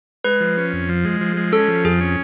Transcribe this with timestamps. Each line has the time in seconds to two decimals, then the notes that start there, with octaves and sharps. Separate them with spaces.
0.24 G#3 B4
0.41 F3
0.57 C#4
0.73 F2
0.89 F3
1.05 G#3
1.21 F3
1.37 G#3
1.52 C#4 A4
1.68 F3
1.84 F2 G#4
2.01 C#4